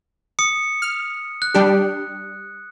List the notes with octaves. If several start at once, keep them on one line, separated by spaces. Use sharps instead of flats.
D#6 C#7
F6
F#6
G3 D4 G4